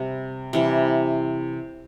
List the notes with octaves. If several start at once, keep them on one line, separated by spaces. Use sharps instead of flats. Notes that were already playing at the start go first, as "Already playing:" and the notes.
Already playing: C3 G3
C3 E3 G3